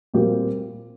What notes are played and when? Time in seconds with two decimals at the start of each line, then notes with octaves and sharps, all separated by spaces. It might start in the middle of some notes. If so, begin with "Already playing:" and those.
0.14 A#2 G3 C4 G4 A#4